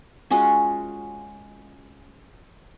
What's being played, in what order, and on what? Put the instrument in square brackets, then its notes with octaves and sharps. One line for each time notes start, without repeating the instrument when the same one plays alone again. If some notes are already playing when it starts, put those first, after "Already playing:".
[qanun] G#3 C#4 F4 F#4